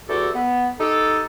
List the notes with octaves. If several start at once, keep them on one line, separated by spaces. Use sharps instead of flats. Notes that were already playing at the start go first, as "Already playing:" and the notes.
E2 F#4 G4 A4
B3
D#4 G4 A4